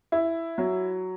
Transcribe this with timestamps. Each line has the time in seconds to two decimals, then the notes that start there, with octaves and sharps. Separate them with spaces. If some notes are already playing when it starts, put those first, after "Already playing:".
0.12 E4
0.58 F#3